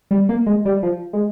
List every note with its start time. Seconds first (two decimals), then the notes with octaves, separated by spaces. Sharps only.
0.11 G3
0.29 A#3
0.46 G#3
0.65 G3
0.83 F3
1.13 G#3